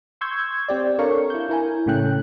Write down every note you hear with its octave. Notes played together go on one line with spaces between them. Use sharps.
C6 C#6 E6 G6 G#6
C4 G4 D5
D4 A4 A#4 C#5 F5 C#6
E4 G6
E4 A#4 G#5
A2 C#3 A3 C#4 G5 F#6